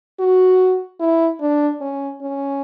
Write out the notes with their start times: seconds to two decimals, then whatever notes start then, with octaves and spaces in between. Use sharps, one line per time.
0.20 F#4
1.00 E4
1.41 D4
1.81 C#4
2.21 C#4